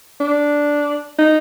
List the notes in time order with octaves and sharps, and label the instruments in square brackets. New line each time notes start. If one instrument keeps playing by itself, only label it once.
[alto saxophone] D4
D#4